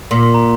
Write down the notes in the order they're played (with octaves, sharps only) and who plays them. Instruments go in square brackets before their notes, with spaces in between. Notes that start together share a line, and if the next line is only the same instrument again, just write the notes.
[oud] A#2 [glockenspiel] C6
[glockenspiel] C6
A#5